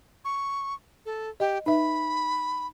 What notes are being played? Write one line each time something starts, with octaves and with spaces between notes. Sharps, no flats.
C#6
A4
G4 D#5
D#4 B4 E5 B5